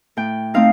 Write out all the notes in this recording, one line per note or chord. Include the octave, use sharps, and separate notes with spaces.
A2 G5
A3 C4 D#4 F5